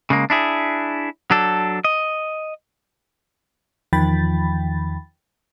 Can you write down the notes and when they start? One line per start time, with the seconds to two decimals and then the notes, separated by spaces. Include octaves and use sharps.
0.10 C#3 G#3 A#3
0.30 D4 E4 G#4
1.31 F#3 D4 A4
1.85 D#5
3.93 E2 D#3 F3 G5 B5 A6